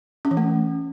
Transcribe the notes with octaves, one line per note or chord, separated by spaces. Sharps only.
C#4
E3
A3